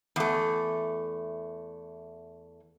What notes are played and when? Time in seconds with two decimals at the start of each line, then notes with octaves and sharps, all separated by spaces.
0.16 E2 A3